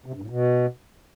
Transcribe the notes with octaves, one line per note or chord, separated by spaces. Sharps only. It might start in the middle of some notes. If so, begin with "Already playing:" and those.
C3
G2
A2
B2